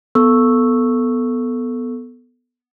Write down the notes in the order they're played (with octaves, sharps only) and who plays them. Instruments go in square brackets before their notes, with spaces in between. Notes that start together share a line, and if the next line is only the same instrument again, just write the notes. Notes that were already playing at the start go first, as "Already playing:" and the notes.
[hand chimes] B3 A4 C#6 E6